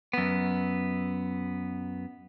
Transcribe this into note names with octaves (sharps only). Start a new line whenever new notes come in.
F#2 B3